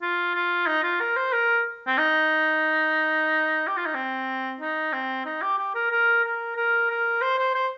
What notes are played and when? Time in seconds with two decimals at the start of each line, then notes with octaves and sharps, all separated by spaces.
0.02 F4
0.34 F4
0.67 D#4
0.83 F4
1.00 A#4
1.17 C5
1.33 A#4
1.87 C4
1.98 D#4
3.67 G4
3.77 F4
3.86 D#4
3.95 C4
4.60 D#4
4.93 C4
5.25 D#4
5.42 G4
5.59 G4
5.75 A#4
5.91 A#4
6.24 A#4
6.56 A#4
6.90 A#4
7.22 C5
7.39 C5
7.55 C5